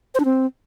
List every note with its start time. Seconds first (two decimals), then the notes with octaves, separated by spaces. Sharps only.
0.15 C5
0.20 D4
0.25 C4